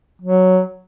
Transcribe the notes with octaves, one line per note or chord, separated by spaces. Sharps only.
F#3